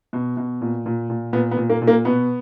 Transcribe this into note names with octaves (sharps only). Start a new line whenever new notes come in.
B2
B2
A#2
A#2
A#2
A#2 B3
B3
A#2
A#3
A#2
A#3
B2 B3